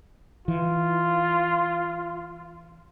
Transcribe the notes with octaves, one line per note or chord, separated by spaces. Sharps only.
E3 F4